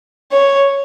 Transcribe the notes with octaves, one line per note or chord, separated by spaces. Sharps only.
C#5